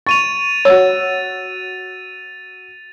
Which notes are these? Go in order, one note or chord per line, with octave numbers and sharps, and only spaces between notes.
C#6 A6 D#7 F7
F#4 C#5 E6 A6